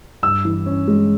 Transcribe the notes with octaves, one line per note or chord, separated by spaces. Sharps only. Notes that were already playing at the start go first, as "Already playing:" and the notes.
G2 E6
E3
C#4
G#3